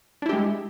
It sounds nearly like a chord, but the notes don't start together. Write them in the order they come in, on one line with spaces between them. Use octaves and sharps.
D4 E4 G4 G#3